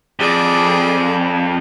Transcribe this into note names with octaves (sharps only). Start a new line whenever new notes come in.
F2 G#4 D5